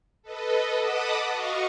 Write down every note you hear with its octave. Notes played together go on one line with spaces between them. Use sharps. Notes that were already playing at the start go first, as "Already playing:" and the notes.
A4 B4 D#5
D#5 F#5 A5 B5 D6 D#6
F#4 D#5 F5 C#6